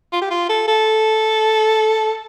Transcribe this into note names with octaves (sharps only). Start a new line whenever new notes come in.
F4
G4
F4
A4
A4